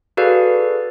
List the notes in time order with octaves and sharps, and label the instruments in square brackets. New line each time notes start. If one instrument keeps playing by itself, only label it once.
[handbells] F#4 G#4 A4 B4 D5 F5